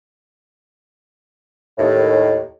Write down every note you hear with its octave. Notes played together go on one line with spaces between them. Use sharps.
D#2 A2